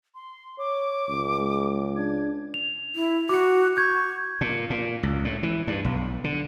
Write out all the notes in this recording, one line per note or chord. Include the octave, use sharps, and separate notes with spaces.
C6
C#5 D6
C#2
G#3
D4 G#6
F7
E4
F#4 D6 C#7
C#6 G6 G#6
A#2
A#2
C#2
A2
E3
G2
B1
D3